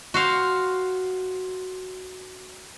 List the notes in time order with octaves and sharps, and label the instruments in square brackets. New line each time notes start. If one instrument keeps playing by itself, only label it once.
[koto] F#4 C5 F5